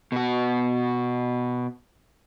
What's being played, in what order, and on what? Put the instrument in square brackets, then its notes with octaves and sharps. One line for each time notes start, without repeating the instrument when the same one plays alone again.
[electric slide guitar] B2 F#4